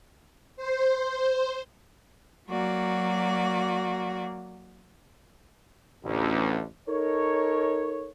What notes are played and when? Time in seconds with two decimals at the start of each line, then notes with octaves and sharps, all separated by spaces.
0.56 C5
2.48 F#3 A#3 F#4 D5
6.04 A1 D2
6.88 D#4 A4 A#4 C#5